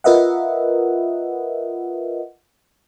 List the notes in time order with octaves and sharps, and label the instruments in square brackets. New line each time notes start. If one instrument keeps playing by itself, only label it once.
[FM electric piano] F4 A#4 B4 D#5 E5 F#5